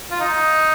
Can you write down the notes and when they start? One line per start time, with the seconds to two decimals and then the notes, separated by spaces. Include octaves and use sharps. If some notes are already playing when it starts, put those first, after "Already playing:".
0.11 F4
0.20 D#4